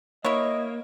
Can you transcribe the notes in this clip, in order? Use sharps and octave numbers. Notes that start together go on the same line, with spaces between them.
A#3 E4 C#5 D#5